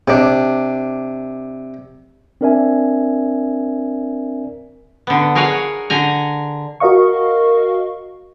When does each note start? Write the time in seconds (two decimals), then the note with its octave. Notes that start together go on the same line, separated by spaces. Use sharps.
0.08 C3 D4
2.41 C4 D4 A#4 D5 E5 G#5
5.07 D3 B3
5.35 G#4 A#4 C#5 F5 F#5 G#5
5.90 D3 G#5 A#5
6.80 F#4 A#4 D#5 F5 C#6